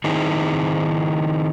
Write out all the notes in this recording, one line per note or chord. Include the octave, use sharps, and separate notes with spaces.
D#3 C4 D#4 E4 G#4